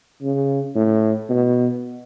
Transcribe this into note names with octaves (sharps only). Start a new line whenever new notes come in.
C#3
A2
B2